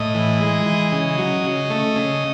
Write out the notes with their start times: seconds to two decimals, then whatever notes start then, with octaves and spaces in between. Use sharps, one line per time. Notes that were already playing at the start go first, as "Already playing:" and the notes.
Already playing: A2 D#5
0.15 E3
0.41 G#3
0.66 E3
0.92 C#3
1.18 F#3
1.44 C#3
1.70 A3
1.96 C#3